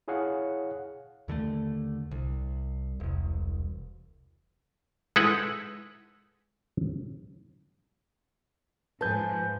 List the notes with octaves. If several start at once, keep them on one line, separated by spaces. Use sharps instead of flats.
E4 G#4 C#5 F5 F#5
D#2 D3 D#3 A3
C2
E1 C2
G#3 D#4 E4 A4 B4 F#5
G#2 F3 B4 G#5 A5 G6